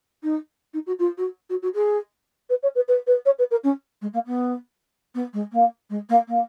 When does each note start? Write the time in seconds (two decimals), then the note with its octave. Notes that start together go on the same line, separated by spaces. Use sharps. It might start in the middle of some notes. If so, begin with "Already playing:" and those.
0.23 D#4
0.73 D#4
0.86 F#4
0.99 F4
1.17 F#4
1.49 F#4
1.62 F#4
1.74 G#4
2.49 B4
2.63 C#5
2.75 B4
2.88 B4
3.07 B4
3.25 C#5
3.38 B4
3.51 A#4
3.64 C#4
4.01 G#3
4.13 A#3
4.26 B3
5.15 B3
5.33 G#3
5.52 A#3
5.90 G#3
6.09 A#3
6.28 A#3